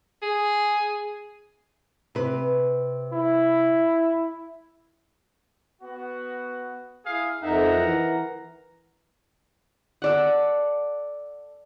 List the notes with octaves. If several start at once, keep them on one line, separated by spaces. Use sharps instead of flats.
G#4
C3 B4
E4
B3 F#4
E4 G#4 F5
F2 D#4 A#4 E5 F#5 A#5
E3
A4 D5 F#5